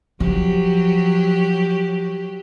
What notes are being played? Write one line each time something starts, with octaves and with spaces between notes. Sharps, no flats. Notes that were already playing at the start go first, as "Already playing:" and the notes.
F3 F#3 G4